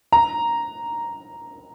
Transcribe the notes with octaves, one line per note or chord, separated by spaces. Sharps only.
A#5